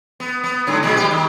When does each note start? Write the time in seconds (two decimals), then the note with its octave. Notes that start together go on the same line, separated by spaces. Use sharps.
0.20 B3
0.44 B3
0.67 G#2 D3 F#3
0.83 A#2 G#3
0.96 G3 G4
1.11 D#3